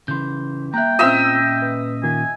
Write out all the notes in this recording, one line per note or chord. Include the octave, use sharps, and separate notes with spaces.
C#3 E3 C6 G6
A#3 E5 G5 A#5 F#6
A#2 C4 C#4 F4 D#5 E5 A#5 E6
B4
D#3 A#3 F4 G#5